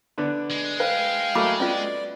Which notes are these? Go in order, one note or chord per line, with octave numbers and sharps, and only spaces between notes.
D3 B3 D4
G#3
B4 F5 G5
F#3 A3 A#3 B5 D6
B3 C#4 F4 D5